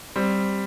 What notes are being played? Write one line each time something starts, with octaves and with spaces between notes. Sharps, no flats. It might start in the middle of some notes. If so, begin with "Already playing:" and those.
G3 C4